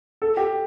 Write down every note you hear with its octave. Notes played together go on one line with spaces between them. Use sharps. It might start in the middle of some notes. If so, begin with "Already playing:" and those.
A4
G4